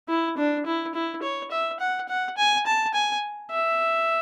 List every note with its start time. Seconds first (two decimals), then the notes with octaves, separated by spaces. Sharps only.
0.08 E4
0.37 D4
0.66 E4
0.94 E4
1.22 C#5
1.51 E5
1.80 F#5
2.09 F#5
2.38 G#5
2.66 A5
2.94 G#5
3.51 E5